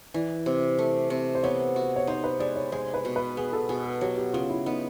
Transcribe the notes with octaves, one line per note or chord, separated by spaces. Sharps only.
E3 D5
C3
A3
C3
C5
B3 C#5
F#4
C#5
D#4 C5
B4
G#3 D5
C#5
G#3 C5
B4
B2
B4
B3 G#4
A4
B2 G#4
G#4
F#3 G4
G4
C#3 F4
E4
B3 D#4